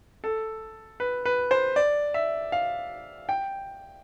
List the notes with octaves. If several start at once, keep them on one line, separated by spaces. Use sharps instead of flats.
A4
B4
B4
C5
D5
E5
F5
G5